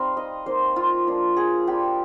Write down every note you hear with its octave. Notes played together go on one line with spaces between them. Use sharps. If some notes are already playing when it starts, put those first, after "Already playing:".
Already playing: G3 C4 D#4 F5
D#5
A#3 D#4 C5
F4
F3 A#3 D4 F4
G#4
G3 D4 F4 G4